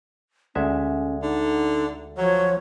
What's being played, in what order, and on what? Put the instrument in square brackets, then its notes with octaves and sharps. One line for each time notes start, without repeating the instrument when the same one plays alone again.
[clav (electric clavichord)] D2 G#3 E5 [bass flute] C#4
[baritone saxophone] D3 [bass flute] D#4
[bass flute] F3 [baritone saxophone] F#3 [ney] C#5